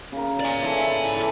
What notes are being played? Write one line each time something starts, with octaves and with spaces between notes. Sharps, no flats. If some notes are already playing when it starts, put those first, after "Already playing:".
C#3 A#4
D5 G#5
E3 A4
E5 A5 B5
E3 A4